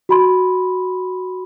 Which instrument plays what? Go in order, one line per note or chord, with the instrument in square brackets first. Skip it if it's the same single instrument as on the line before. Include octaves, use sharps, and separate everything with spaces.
[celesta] F#4 B5 C6